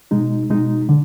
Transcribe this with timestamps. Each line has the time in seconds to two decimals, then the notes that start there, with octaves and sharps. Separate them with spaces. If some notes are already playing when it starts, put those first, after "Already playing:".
0.11 B2 G#3 D#4
0.50 B2 G#3 D#4
0.89 D3